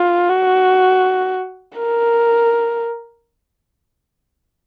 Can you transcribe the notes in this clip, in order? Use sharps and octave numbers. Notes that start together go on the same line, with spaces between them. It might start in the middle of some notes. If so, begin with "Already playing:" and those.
Already playing: F4
F#4
A#4